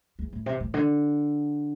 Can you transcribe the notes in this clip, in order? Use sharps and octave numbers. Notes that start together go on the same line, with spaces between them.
E2
A2
C3
A2
D3